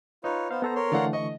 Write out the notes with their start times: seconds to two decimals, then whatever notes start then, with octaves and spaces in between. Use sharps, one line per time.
0.24 D#4 F4 B4 C#5
0.51 B3 C5 F5
0.62 B3 A4 C5 A#5
0.75 A#4 C#5 C6
0.92 D3 E3 A3 D5 F5 F#5
1.13 D#5 C#6